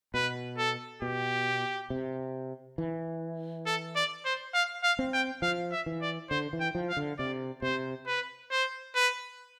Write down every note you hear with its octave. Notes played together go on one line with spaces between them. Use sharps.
B2 B4
A4
B2 G4
C3
E3
A4
D5
C5
F5
F5
C4
G5
F3 F5
E5
E3
D5
D3 C5
E3
G5
F3
F5
D3
C3 D5
C3 C5
B4
C5
B4